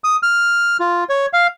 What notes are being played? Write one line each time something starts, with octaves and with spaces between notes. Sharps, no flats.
D#6
F6
F4
C#5
F5